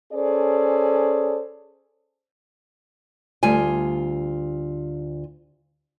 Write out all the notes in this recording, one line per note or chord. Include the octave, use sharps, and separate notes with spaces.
C#4 G#4 A4 C5 D5
D2 G3 F4 G#5